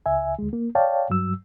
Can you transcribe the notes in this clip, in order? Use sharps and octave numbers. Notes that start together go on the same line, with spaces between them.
C#2 E5 G#5
D2 G#3
A#3
C#5 D5 F5 G5 A5
G2 F#3 E6